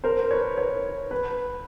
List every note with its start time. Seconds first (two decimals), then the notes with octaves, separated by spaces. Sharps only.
0.04 A#4 C5
0.31 B4 C#5
0.57 B4 C#5
1.11 B4